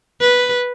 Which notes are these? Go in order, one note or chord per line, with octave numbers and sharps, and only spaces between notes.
B4